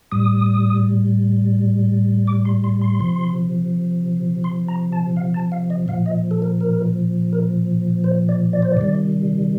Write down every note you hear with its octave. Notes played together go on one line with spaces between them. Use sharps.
A2 G3 D#6
D6
C6
C6
C6
C3 F3
C6
A#5
A5
F5
A5
F5
D#5
A#2 F3 F5
D#5
A4
A#4
A#4
A#4
C5
D5
D5
C5
D5
C3 D#3 G3